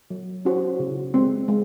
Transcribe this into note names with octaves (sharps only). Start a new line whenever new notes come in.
F#3
C#4 F#4 C5
C#3
G#3 C4
G#3